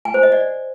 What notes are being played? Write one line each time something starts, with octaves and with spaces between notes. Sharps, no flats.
G#5
C5
D#5
D5